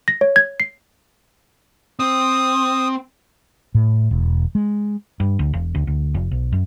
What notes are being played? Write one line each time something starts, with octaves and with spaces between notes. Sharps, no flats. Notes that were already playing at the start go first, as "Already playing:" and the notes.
A#6
C#5
G#6
C7
C4 D#6
A2
E1
G#3
G2
D2
E1
D2
D2
F1
B1
F#2